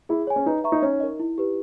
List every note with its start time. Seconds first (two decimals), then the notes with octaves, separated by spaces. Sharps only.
0.09 E4 G#4
0.27 C#5 G#5
0.36 C#4
0.46 D#4 B4
0.64 E5 A#5 C#6
0.72 D#4
0.82 C#4 D#4
1.00 A#4 D#5
1.20 E4
1.38 G4 B4